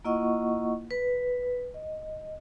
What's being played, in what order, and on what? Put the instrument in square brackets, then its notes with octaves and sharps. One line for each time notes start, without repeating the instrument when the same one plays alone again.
[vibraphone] A#3 E4 F4 D#5 F#5 C#6
B4
D#5